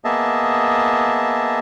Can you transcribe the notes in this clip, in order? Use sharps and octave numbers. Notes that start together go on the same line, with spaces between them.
A#3 B3 G#4 D#5 E5 A5